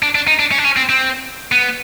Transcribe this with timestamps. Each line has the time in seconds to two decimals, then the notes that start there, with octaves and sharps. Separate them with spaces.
0.02 D4
0.15 D4
0.27 D#4
0.39 D4
0.52 C#4
0.58 D4
0.65 C#4
0.77 C4
0.89 C4
1.52 B3